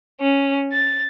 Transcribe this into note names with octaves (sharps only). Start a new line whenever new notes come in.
C#4
A6